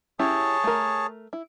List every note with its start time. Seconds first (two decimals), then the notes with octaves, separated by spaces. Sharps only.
0.19 C#4 E4 G4 G#4 C#5 A5
0.64 A3 A#4
1.33 E4